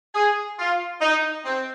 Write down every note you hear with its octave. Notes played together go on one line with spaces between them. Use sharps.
G#4
F4
D#4
C4